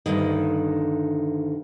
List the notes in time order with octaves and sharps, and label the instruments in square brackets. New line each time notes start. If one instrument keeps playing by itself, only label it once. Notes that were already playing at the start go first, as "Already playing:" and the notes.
[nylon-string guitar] D2 G2 D3 D#3